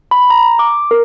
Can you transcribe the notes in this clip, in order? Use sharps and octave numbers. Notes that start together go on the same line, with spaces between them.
B5
A#5
D6
A#4